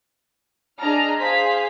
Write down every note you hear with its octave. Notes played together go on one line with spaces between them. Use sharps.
D4 G#4 D#5 A5 A#5 F6
G#4 C5 F5 B6